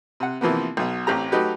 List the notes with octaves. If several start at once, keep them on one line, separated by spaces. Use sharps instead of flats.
C3 F#5
C3 E3 F3 A#3 B3
B1 B2
A1 C4 G4 A#5
F#3 A3 D#4 F#4 G4 B4